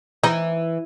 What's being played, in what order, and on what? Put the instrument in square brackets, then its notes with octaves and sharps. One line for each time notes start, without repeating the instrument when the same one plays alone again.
[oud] E3 [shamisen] D#4